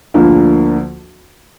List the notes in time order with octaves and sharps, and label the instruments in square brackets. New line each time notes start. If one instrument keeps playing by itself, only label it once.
[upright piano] D2 D3 F3 A#3 F4